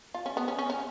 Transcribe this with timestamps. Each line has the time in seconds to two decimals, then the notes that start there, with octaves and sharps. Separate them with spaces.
0.14 F4
0.26 C#4
0.37 B3
0.48 C#4
0.59 C#4
0.70 C#4